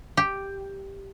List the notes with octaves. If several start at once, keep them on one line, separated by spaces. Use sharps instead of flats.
G4